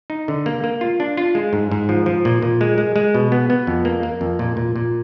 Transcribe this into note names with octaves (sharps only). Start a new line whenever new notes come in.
D#4
D3
A#3
A#3
F4
D4
F4
G#3
G#2
G#2
F3
F3
A#2
A#2
G#3
G#3
G#3
B2
B3
B3
F2
A#3
A#3
F2
A#2
A#2
A#2